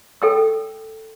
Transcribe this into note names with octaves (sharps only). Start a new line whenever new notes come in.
A4 G5 E6